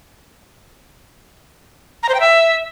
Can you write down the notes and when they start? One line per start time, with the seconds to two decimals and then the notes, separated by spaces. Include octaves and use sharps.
2.03 A#5
2.09 C5
2.14 G5
2.20 E5